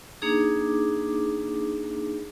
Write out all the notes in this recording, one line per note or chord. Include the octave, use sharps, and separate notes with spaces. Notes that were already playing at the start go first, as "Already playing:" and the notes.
A#3 D4 D#4 G#4 D6